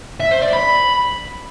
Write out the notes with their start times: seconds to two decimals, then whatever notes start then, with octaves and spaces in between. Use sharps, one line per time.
0.20 E5
0.31 C5
0.42 D5
0.53 B5